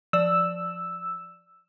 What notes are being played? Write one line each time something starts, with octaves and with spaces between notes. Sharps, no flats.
F3 D5 E6